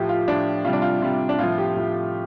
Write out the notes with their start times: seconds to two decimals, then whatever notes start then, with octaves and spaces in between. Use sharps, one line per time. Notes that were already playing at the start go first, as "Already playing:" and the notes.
Already playing: A2 F3 G4
0.09 F4
0.27 A2 F3 D4
0.65 C3 G3 F4
0.73 D4
0.82 F4
1.01 C3 G3 F4
1.29 D4
1.38 A2 F3 F4
1.58 G4
1.76 A2 F3